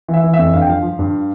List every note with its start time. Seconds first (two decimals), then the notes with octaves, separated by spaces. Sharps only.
0.08 E3
0.14 E5
0.24 E3
0.34 E5
0.39 F2
0.54 G2 F5
0.62 G5
0.68 F3 F5
0.83 F3
0.99 G2